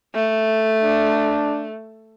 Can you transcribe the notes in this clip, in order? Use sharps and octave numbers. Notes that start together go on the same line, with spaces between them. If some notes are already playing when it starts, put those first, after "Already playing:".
A3
D4